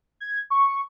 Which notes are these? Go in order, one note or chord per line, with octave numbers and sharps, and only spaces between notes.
G#6
C#6